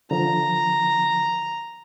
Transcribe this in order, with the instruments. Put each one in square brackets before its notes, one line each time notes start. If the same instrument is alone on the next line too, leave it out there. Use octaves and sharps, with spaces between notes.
[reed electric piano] D3 F3 [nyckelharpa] A#5